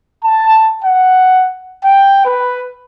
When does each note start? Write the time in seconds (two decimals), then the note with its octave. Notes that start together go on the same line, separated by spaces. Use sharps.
0.23 A5
0.83 F#5
1.84 G5
2.25 B4